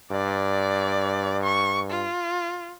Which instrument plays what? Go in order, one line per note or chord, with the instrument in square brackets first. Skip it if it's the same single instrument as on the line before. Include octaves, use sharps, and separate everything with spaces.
[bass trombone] G2 [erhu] D5
[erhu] C#6
F4